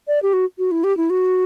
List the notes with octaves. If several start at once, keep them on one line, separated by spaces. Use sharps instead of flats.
D5
G4
F#4
F#4
E4
G4
E4
F#4